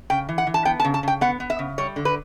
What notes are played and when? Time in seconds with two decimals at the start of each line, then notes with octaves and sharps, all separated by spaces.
0.10 C#3 G5
0.29 E3
0.38 F#5
0.47 E3
0.54 A5
0.65 B3 G5
0.80 A5
0.84 C#3
0.94 A5
1.03 C#3 G5
1.21 B3 F#5
1.40 B3
1.50 E5
1.59 C#3
1.78 G3 C#5
1.96 D3
2.05 B4